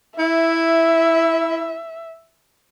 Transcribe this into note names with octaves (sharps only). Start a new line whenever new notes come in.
E4 E5